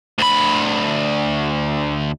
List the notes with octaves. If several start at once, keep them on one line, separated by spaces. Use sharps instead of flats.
D2 B5